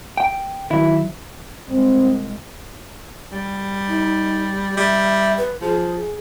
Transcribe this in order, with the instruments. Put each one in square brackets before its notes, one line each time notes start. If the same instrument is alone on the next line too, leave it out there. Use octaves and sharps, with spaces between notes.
[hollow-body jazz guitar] G5
[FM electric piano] D#3 F#3 [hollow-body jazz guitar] E4
[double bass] C2 G#3 [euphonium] C4
[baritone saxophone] G3
[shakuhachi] D#4
[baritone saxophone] G3 [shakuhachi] E5
[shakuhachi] B4
[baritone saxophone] F3 [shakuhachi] G#4